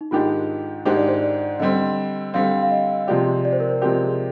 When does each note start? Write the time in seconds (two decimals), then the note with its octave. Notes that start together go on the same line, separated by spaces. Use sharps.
0.01 D#4
0.11 G#2 D#3 G#3 D4 F4 G4
0.85 G#2 D#3 G#3 D4 G4 C5
0.97 D5
1.08 C5
1.22 D5
1.60 D3 G3 C4 D#5
2.34 D3 G3 C4 F5
2.63 F5
2.71 D#5
3.08 C3 F3 G#3 C4 G4 D5
3.45 D5
3.53 C5
3.60 A#4
3.69 C5
3.82 C3 F3 G#3 C4 G4 A#4
4.07 G#4